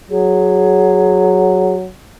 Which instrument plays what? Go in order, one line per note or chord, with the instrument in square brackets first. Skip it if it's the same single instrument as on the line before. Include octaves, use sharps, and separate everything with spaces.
[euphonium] F#3 [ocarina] G#4